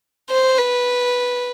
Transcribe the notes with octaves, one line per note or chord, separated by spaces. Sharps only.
C5
B4